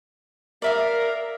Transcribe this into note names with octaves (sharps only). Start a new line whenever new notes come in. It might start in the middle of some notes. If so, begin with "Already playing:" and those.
A#4 D5 E5 F5